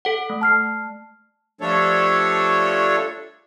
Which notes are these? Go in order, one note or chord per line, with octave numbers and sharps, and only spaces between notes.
A4 F#5
A3
A5 F6 C7
F3 G3 A3 D4 A4 C#5